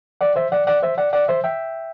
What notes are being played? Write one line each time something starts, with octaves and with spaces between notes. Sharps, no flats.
D5 F#5
C5 E5
D5 F#5
D5 F#5
C5 E5
D5 F#5
D5 F#5
C5 E5
E5 G5